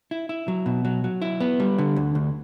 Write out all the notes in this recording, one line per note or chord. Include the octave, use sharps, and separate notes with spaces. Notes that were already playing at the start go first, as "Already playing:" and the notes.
E4
E4
F#3
B2
F#3
F#3
E4
B3
G3
D3
D2
D2